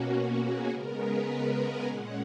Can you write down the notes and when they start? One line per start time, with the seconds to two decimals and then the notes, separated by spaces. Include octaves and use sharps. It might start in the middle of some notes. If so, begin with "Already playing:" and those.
Already playing: B2 A#3 C#4 F#4
0.39 G#4
0.68 C#3 G#3 B3 A#4
0.98 B4
1.56 G#5
1.86 A#2 G#3 C#4 F#5